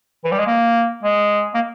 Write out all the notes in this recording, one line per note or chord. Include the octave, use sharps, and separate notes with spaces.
E3
G3
G#3
A#3
G#3
A#3